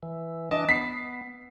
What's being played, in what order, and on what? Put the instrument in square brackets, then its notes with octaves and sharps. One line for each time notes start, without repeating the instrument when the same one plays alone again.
[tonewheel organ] E3
[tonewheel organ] E3 D4 A5 [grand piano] D#5
[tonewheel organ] B3 [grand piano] B6 C7